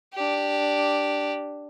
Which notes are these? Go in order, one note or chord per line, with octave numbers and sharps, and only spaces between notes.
D4 G4